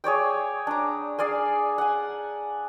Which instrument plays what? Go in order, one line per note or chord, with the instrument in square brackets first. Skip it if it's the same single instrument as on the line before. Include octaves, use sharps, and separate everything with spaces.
[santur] G#4 C#5 D5 G5
D4 A#5
G#4 D5 F5 G#5
F#5 G#5